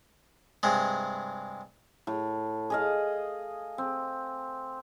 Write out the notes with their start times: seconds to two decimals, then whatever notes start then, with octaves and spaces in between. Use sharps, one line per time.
0.63 G2 C3 G#3
2.07 A2
2.70 G#4 D#5 F5
3.78 C4